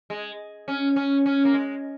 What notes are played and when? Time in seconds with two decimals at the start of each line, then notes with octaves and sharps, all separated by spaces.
0.10 G#3
0.68 C#4
0.96 C#4
1.26 C#4
1.45 A#3
1.54 G#3